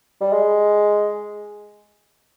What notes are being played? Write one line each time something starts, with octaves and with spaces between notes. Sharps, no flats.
G3
G#3